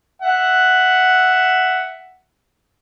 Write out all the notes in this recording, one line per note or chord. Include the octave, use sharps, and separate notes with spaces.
E5 F#5